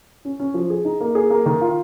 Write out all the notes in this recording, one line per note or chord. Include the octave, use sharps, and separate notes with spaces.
C#4
C#4
F3
G#4
D#4
A#3
G#4
A#3
D#3
F4